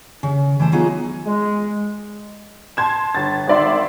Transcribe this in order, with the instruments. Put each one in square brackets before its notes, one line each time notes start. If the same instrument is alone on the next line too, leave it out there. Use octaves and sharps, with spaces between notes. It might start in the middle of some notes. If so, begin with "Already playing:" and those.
[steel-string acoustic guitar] C#3
E3 A3 C5
F#3 B3 D#4 F4 G#4
[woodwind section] G#3
[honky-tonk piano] A5 C6 G#6 E7
G1 A6
G#1 D#3 D5 E5 C6